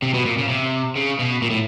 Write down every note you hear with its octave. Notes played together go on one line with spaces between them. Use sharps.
C3
B2
A#2
C#3
C3
C#3
B2
A#2
A2